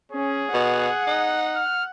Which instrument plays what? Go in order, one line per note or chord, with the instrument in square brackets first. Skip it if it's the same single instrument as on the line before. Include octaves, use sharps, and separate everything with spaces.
[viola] C#4 [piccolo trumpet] G#4
[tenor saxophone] B2 [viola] F#5
[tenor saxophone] D#4
[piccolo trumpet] F6